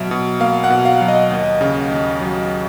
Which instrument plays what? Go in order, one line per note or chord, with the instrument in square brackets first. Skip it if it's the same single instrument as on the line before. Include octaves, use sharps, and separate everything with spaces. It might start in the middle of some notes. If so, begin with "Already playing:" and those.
Already playing: [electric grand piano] B2 F#3 E5
B2
A#3 F5
F#5
B2
F5
F#3
D#5
D#2
C#3
D#2
F#3